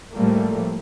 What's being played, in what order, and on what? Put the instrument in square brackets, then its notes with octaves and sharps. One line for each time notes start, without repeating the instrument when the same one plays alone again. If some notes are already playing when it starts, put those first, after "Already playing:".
[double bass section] A2 F3 G3 A3 A#3